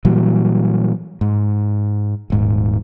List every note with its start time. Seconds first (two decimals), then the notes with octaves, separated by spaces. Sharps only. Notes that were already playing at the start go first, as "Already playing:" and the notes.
0.05 A#2 E3 F#3 G3
1.21 G#2
2.30 D#1 G#2